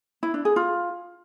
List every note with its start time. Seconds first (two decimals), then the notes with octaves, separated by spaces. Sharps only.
0.23 E4
0.34 D4
0.45 G#4
0.56 F4